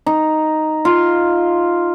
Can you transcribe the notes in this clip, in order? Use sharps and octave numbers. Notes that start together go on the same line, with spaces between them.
D#4
F4